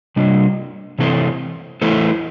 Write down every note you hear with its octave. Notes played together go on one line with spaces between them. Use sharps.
C3 G3 D4
C3 E3 C4 A4 C5
E3 A3 E4 A4 C5